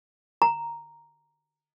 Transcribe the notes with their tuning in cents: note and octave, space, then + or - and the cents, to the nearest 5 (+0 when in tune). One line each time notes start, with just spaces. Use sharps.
A#5 +0